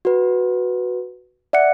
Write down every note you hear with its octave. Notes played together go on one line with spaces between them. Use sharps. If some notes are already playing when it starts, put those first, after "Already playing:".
F#4 B4
D5 E5 F#5 F#6 C#7